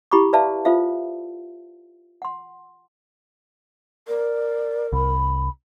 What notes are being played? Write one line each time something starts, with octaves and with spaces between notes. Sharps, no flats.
E4 G4 B5 C#6 D6
B4 D5 E5 F5 A5
F4 A4 C5 E5 F5
F#5 C6
A#4 D5
C2 B5